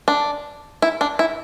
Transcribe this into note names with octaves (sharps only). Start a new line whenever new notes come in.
D4
E4
D4
E4